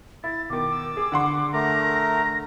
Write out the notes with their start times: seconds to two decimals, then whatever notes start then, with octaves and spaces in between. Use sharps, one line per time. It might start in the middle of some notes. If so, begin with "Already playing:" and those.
0.24 E4 A6
0.50 B2 D#3 D6
0.71 E6
0.97 G#4
1.12 D3 F#5 C6
1.53 A3 A#4 A#5 A#6